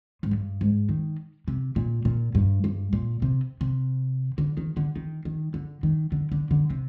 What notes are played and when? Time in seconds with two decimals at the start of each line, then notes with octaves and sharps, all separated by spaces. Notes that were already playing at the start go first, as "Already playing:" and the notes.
0.23 G#2
0.31 G2
0.61 G#2
0.89 D#3
1.48 C3
1.76 A#2
2.05 A#2
2.35 G2
2.64 G2
2.93 A#2
3.22 C3
3.61 C3
4.38 D3
4.57 D#3
4.77 D3
4.96 D#3
5.25 D#3
5.54 D3
5.83 D#3
6.12 D3
6.32 D3
6.51 D3
6.70 C3